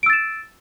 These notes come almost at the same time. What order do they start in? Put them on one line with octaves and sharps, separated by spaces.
D7 E6 A6 E7